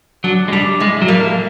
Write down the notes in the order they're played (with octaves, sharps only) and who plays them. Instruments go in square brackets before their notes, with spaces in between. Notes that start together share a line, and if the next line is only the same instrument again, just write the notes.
[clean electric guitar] F#3 [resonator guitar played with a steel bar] D4
[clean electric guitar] G#3
[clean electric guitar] G3 [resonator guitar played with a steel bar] D4
[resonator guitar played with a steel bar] A2 [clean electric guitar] G#3
[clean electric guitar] F#3
[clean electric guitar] G3 [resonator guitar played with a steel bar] A#3